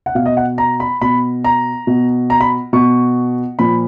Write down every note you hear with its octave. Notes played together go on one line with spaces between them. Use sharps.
F#5
B2 F5
D#5
F#5
A#5
B5
B2 B5
A#5
B2
A#5
B5
B2 C#6
A#2 F3 B5